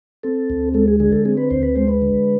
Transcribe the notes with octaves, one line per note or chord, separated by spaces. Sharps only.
C4 A4
D2
G#3 A4
G#4
D3 G#4
A4
C4 G#4
B4
D2 C5
B4
G#3 C5
B4
D3